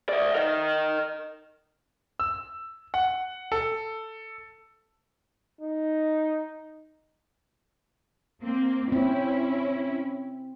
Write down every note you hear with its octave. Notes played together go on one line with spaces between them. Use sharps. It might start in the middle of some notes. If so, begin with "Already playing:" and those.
D5 E5
A#4 D#5
E6
F#5
A4
D#4
A#3 C4
C4 C#4 E4